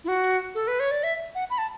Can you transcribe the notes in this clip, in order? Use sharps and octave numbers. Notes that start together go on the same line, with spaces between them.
E4
F#4
A4
B4
C#5
D5
E5
F#5
B5
A5